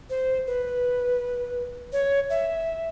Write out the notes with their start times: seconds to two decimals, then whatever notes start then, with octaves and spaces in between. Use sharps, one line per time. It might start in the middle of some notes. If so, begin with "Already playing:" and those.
0.10 C5
0.47 B4
1.93 C#5
2.30 E5